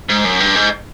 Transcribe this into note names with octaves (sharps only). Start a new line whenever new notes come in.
G#2
F#2
G2
G#2